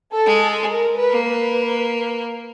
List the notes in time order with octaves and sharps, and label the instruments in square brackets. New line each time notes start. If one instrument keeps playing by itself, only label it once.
[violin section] A4
[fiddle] G#3
[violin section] A4
A#4
B4
[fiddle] A#3
[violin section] B4